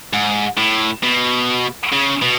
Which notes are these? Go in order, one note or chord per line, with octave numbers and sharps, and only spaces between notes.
G#2
A2
B2
C#3
B2